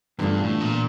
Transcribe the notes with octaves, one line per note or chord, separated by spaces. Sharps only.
E2 G2 D3 A3 D4 F4
A2
A#2